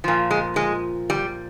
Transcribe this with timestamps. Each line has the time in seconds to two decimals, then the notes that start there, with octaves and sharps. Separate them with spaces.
0.04 A#2 F3
0.31 G#3
0.56 G#3
1.10 G3